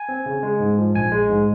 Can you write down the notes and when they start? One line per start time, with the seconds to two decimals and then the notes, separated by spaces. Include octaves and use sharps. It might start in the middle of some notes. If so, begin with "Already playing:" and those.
Already playing: G#5
0.09 C4
0.26 C#3
0.43 G#3
0.60 G#2
0.78 F3
0.95 A#1 G#5
1.12 G#3
1.29 G#2